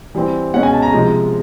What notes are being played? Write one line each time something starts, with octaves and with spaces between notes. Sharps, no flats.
E3 G3 C4
B2 G#3 C#4 F#5
G#5
A5
A#5
C3 F3 G#3